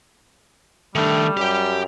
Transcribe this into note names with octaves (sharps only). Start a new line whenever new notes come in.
D#3 G3 A3 D4
F#2 G4 G5